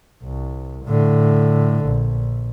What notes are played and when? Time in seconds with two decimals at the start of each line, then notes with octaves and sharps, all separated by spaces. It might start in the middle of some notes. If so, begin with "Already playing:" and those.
0.24 C2
0.86 A2 D3
1.85 A#1